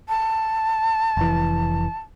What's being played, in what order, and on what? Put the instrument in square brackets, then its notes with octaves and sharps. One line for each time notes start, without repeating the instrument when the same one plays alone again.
[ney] A5
[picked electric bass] F1 E3